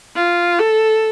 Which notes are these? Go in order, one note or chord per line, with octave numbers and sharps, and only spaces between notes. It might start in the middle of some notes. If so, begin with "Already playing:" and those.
F4
A4